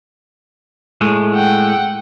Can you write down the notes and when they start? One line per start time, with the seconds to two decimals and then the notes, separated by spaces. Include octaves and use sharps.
1.01 A2 G#3 A3
1.35 F#5 G5